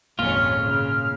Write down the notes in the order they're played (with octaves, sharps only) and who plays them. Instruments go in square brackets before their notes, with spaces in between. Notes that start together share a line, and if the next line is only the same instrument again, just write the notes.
[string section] G#1 F2 C#4 [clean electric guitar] A#2 F4 [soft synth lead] F6
[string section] C#3